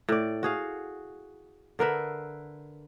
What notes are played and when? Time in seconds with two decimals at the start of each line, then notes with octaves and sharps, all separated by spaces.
0.09 A2 D5
0.43 F#4 G#4 F5
1.79 D3 A#4 B4 E5